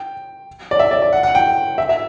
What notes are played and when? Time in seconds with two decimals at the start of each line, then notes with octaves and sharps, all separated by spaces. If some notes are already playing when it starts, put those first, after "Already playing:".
Already playing: G5
0.71 D5
0.79 E5
0.91 D5
1.02 D5
1.13 F#5
1.23 F#5
1.35 G5
1.78 E5
1.89 E5